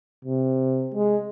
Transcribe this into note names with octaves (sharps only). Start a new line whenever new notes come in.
C3
G#3